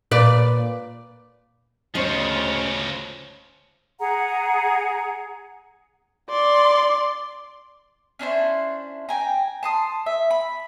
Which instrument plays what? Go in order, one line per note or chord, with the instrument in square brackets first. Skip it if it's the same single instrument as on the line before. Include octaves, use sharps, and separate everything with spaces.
[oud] A#2 B4 D5
[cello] D2 C#5 [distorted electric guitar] C#3 F3 [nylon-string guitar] C#4 C5 D#5
[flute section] G#4 F#5 A#5
[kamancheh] D5 C6
[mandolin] C#4 D4 E4 C5
G5 G#5 A#5
A5 C6 D#6
E5
B5